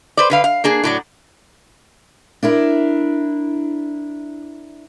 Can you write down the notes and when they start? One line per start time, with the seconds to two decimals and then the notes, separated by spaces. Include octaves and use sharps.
0.17 B4 C5 D5
0.30 D3 B4 F5
0.44 F5
0.64 A#3 D4 G#4
0.83 A2 F#3 D5
2.43 D4 E4 A#4